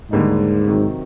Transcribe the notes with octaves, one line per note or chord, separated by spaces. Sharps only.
D#2 G#2 D3 G3 A#3 D#4
C3 D#3 F#3